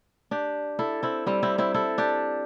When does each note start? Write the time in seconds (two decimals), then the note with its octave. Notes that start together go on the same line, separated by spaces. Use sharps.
0.31 D4 G4
0.79 E4 A4
1.03 C4 E4
1.26 G3 C4
1.43 C4 E4
1.58 C4 E4
1.74 E4 A4
1.98 D4 G4